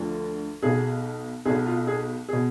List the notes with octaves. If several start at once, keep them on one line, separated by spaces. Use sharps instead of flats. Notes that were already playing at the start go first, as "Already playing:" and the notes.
Already playing: D2 D3 F3
B1 B2 G#4
B1 B2 G#4
F4
G#4
B2 G#4